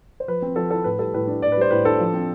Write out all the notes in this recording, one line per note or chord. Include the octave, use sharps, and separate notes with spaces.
C5
F3 B4
C4
F3 A4
E4 A4
A2 B4
G3 A4
A2 B4
D4
A2 D5
B4
G3 C5
A2 B4
D4 A4
F3
C4